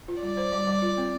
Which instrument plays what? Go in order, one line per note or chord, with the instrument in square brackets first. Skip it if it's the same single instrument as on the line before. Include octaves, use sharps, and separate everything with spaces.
[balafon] F4
[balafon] G3 [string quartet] D5
[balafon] C5
G3
G3
F4
C4